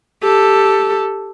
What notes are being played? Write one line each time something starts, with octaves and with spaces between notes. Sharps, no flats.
G4 A4